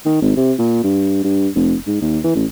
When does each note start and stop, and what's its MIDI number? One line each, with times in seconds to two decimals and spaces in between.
0.05 0.19 51
0.22 0.33 32
0.37 0.53 48
0.58 0.80 46
0.84 1.20 43
1.24 1.48 43
1.55 1.75 29
1.87 1.98 44
2.01 2.19 39
2.24 2.35 52
2.35 2.45 33